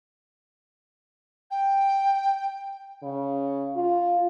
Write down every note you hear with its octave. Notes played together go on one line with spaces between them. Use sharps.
G5
C#3
F4